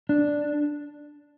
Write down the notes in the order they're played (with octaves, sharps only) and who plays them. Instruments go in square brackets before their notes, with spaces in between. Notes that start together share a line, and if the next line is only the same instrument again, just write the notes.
[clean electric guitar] D4